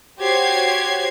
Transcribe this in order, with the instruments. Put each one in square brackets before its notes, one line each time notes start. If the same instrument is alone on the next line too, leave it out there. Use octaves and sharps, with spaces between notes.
[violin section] F#4 G4 C5 C#5 G#6 C7